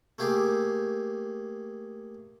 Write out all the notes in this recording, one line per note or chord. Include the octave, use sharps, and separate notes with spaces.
A3 A#3 G4 G#4